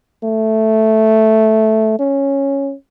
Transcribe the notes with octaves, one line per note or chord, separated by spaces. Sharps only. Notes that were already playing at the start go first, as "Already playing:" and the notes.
A3
C#4